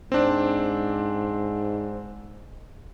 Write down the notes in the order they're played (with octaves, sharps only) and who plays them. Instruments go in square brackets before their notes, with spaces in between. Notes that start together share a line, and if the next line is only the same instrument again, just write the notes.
[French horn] G#2 [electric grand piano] C4 D4